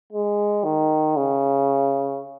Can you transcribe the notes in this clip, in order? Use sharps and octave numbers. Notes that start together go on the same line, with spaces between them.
G#3
D#3
C#3